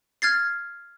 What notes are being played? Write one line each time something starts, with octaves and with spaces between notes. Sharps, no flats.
F6 G#6 A6 C7